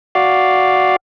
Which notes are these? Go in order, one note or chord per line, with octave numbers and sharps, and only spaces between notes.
F#4 D5 F5